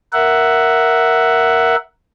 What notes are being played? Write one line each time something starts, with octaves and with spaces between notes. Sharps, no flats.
A#4 E5 F#5